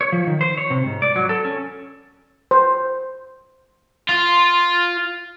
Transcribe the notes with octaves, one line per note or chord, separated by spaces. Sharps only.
C#5
F3
D#3
C5
C#5
C3
G#2
D5
F#3
A4
C#4
C5
F4